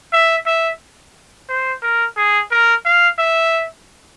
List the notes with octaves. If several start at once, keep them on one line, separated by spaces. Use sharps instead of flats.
E5
E5
C5
A#4
G#4
A#4
F5
E5